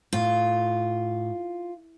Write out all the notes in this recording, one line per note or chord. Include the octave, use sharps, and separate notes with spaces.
A2 F4